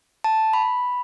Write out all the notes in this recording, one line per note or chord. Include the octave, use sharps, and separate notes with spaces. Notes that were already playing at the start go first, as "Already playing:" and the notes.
A5
B5